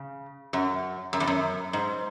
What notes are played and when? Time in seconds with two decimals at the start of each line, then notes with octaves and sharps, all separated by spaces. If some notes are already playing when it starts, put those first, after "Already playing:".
Already playing: C#3
0.53 F#2
1.13 F#2
1.20 E2
1.27 F#2
1.73 G#2